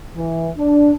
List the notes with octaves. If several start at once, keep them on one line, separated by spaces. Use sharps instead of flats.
E3
D4